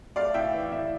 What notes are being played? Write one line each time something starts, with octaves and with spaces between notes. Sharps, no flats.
A3 D5 F5
A2 E5 G5
E3
A2 E5